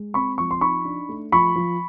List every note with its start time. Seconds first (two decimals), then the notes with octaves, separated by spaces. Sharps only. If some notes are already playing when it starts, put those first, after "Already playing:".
Already playing: G#3
0.14 C4 B5 C#6
0.38 F3 C#6
0.51 C6
0.61 D#4 B5 C#6
0.85 D4
1.09 A3
1.32 F3 B5 C#6
1.56 F3